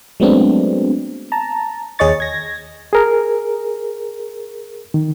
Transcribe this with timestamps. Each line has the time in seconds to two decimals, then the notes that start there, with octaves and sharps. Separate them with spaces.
0.20 F#3 G#3 A3 B3 C4 D4
1.32 A5 A#5
1.99 D#2 G#4 C#5 D#5 C#6 A6
2.20 G#6 A#6
2.93 G#4 A#4
4.94 D#3